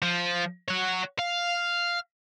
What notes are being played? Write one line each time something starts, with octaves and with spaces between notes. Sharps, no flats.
F3
C#5 F#5
F5